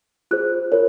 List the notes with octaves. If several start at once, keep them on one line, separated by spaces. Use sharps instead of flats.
F4 G#4 C5 F#6
F4 A#4 C#5